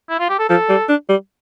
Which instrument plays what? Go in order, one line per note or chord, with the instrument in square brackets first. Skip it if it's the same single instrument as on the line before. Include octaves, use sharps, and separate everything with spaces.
[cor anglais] E4
F4
G4
A4
[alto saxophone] F3 [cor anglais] A4
[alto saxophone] G3
D4
G3